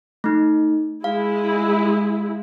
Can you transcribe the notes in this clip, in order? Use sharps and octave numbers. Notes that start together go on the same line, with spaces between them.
A3 D#4
G#3 E4 F5